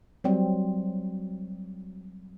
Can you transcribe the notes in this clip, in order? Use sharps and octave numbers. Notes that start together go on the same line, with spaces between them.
F#3 G3 C4